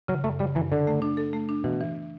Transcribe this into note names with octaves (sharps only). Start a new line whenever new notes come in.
C#3 F#3
F#2 A3
C#3 G3
F#2 E3
D3 A4
A3
D4
A4
A3
D4
B2 E3
E3